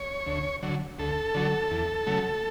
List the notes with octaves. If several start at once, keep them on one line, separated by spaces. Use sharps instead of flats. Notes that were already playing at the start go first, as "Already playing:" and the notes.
Already playing: C#5
D2
D3 F#3
D2 A4
D3 F#3
E2
C#3 F#3 A3